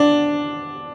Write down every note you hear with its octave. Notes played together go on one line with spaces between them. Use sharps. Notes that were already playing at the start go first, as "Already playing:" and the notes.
Already playing: D4